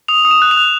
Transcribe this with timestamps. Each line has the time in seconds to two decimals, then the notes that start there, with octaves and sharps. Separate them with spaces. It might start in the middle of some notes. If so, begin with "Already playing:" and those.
0.08 D#6 F7
0.25 D#6
0.31 E7
0.42 F#6
0.51 F7
0.57 F#6